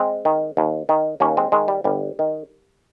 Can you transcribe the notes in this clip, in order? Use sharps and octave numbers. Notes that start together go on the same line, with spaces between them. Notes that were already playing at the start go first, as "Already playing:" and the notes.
Already playing: G#3 C4
D#3
D#2
D#3
D#2 A#3 C#4
G#3 C4
D#3 G#3
G3
G1 G3
D#3